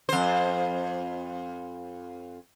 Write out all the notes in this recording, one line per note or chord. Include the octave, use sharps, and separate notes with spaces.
F2 C5